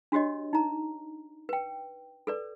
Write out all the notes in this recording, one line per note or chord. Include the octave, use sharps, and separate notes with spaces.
D4 F#4 G4 C#5 D#5
D#4 A#5
B4 G5
A4 B4 D5